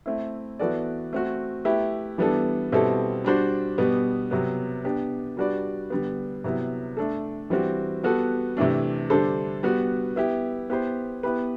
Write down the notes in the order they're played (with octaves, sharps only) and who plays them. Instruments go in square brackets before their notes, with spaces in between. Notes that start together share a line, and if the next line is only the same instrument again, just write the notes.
[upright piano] A3 C4 E4
E3 B3 F#4 A4 D5
A3 C4 F#4
A3 E4 G4 B4
E3 G3 B3 D4 A4
B2 G3 C4 E4 A4
G3 D4 F#4 C5
B2 G3 B3
C3 F#3 B3
B3 D4 G4
G3 D4 F#4 B4 D5
D3 G3 B3
C3 F#3 B3 E4
A3 D4 A4
E3 G3 C4 F#4
G3 B3 F#4 A4
C3 E3 A3 D4
D3 G3 D4 A4 C5
G3 B3 F#4
B3 E4 G4
B3 E4 G4 C5
B3 E4 G4 B4